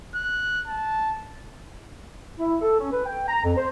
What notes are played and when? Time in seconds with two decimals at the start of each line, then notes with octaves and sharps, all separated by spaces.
0.15 F#6
0.68 A5
2.39 E4
2.62 A4
2.80 C#4
2.92 B4
3.06 G5
3.28 A#5
3.44 F2
3.57 C5